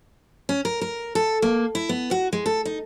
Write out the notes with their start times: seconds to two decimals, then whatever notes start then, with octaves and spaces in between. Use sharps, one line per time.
0.49 C#4
0.65 A#4
0.81 A#4
1.15 A4
1.42 A#3
1.75 E4
1.89 B3
2.11 F#4
2.33 G#3
2.46 A4
2.65 D#4